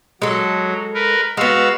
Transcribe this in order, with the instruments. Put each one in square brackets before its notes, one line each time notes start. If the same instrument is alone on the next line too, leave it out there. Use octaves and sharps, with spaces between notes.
[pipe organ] F#3 [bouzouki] G#3 A4
[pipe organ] A#4 B4
[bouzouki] G#3 B3 [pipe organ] F#4 F5 E6